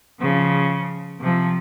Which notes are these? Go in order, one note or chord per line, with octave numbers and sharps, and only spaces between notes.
C#3 F3
C3 F3